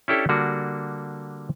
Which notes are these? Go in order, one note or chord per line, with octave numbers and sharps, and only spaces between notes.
C#4 D4 E4 G4 A4 C#5
D3 G3 A#3 D4 F#4